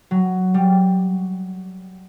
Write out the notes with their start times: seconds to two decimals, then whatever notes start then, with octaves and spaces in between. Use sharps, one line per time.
0.11 F#3
0.54 G3